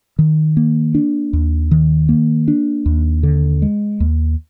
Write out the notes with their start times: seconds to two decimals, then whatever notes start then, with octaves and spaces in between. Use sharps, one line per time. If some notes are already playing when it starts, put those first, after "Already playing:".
0.19 D#3
0.57 A#3
0.95 D4
1.33 D#2
1.71 D#3
2.09 A#3
2.48 D4
2.86 D#2
3.23 D3
3.62 G#3
4.00 D#2